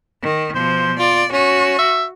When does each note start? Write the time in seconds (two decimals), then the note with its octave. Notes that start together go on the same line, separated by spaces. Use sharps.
0.22 D#3
0.55 B2 F3 C5
0.99 F4 D5
1.33 C#4 F#4
1.79 E5